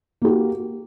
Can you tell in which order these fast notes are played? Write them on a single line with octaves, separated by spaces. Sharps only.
A#3 G4 F#4